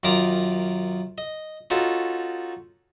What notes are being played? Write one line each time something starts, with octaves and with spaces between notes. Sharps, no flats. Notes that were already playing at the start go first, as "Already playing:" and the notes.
F#2 D#3 F4 A#5 D6 D#6
D#5
C#4 D#4 F4 F#4 A4